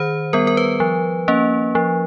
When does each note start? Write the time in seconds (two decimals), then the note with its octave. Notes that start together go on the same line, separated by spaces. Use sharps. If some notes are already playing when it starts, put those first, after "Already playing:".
Already playing: D#3 C5
0.33 G3 B3 A#4
0.47 A#4
0.57 B4
0.80 F3
1.28 A#3 C#4
1.75 F3